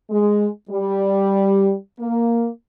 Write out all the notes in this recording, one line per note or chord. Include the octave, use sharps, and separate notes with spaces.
G#3
G3
A#3